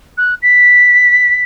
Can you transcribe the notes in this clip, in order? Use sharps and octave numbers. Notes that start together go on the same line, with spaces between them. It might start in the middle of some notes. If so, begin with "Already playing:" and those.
F#6
B6